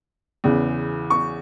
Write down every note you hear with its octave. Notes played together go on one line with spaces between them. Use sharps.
E2 C#3 E3
C#6